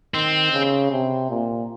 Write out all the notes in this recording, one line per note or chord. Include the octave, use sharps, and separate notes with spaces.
D#3 C4
C#3
C3
A#2